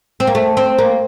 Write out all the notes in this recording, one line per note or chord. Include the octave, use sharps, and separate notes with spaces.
C4
A#3
A3
C4
A#3